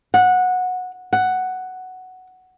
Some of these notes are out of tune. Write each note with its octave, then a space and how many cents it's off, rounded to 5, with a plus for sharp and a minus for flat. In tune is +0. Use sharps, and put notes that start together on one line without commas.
F#5 -15
F#5 +5